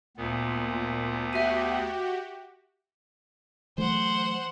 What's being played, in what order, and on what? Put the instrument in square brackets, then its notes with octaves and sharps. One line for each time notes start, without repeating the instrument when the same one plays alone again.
[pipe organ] D2 B3 [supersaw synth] A#2
[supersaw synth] F#4 G4 [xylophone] E5 B6 D#7
[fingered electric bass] E3 F#3 A3 [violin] C5 F#5